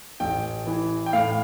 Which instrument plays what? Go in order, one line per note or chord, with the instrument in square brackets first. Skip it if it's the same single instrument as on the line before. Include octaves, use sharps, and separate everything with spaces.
[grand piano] A1 G5
E3
G5
A2 F5